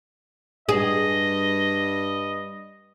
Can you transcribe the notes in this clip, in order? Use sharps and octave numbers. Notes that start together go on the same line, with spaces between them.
G2 G#4 D#5